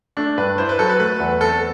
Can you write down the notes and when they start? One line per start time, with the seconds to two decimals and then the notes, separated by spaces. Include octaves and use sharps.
0.17 A3 D4
0.38 G2 B4
0.58 E4 C5
0.69 B4
0.79 F#3 A4
0.89 B4
1.00 A3 B4
1.20 E2
1.41 C4 A4